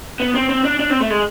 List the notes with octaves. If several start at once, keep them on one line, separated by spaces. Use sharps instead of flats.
B3
C4
C4
D4
D4
C4
A3
G#3